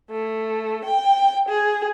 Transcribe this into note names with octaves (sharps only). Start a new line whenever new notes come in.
A3
G5
G#4